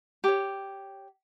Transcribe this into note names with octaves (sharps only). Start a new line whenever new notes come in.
G4 C#5